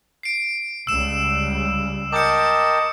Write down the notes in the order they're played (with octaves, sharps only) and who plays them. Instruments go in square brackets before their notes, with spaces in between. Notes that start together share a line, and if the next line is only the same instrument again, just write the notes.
[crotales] C7 D7
[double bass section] C#2 C#3 G3 [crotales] E6 E7
[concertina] A#4 G5 A5 [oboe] D#5 [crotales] D6 G6 C#7